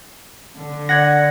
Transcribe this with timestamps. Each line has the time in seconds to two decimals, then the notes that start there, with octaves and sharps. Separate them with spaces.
0.57 D3
0.89 D5 F#5 G#6 A#6